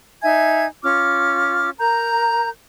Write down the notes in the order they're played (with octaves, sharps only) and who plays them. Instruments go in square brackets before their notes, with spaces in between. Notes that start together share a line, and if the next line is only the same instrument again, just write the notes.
[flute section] D#4 E5 G#5 G#6
C#4 F4 D6 F6
A#4 A#5 G6